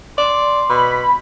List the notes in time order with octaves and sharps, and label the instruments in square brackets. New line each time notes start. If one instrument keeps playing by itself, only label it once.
[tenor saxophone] D5 [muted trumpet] C6
[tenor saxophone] B2 [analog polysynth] B5